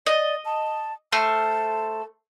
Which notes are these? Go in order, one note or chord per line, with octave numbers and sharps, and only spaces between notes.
D5 D#5
A5
A3 C5 A5 F6